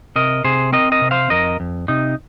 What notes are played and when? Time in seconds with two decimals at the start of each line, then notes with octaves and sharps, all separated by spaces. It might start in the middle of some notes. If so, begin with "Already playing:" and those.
0.16 C3 A#4 D#5
0.44 C3 G#4 C5
0.72 C4 A#4 D#5
0.92 A#4 D#5
1.01 C3
1.11 C5 F5
1.30 F2 A#4 D#5
1.60 F2
1.88 C3 D#4